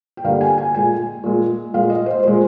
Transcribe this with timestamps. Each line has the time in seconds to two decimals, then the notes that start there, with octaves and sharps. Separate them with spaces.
0.17 G5
0.24 G2 D3 G3 A#3 F5
0.41 G#5
0.58 G#5
0.74 A#2 G#3 G#5
1.23 A#2 G#3
1.74 A#2 G#3 F5
1.90 D#5
2.06 C5
2.23 A#2 G#3 C5